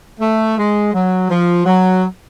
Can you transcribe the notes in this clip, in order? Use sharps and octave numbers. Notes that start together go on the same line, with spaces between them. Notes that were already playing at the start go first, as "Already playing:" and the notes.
A3
G#3
F#3
F3
F#3